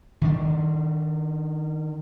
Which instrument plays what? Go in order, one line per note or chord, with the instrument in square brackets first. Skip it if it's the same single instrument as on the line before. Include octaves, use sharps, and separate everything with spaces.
[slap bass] D#3 D4